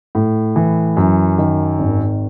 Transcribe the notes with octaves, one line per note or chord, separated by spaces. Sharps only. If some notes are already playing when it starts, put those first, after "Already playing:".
A2
E3
F#2
D#3
G#1